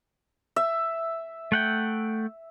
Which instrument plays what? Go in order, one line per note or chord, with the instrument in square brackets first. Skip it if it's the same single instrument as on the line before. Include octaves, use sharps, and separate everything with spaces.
[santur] E5
[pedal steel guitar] A3 F#5 G5